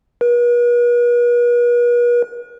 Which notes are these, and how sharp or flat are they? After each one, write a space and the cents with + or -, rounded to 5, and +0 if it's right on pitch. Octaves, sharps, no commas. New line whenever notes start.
B4 -45